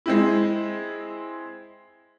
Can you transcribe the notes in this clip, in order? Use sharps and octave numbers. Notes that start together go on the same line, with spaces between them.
G#3 C4 E4